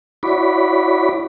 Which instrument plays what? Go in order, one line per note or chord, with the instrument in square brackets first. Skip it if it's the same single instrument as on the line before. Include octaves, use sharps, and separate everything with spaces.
[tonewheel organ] E4 F#4 C#5 D5 B5